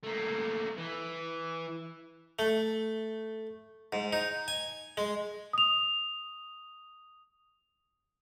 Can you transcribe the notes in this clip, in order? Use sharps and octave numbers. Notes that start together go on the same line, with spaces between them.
A3 A#3
E3
A3
G#2
D#4
G#5
G#3
D#6 F7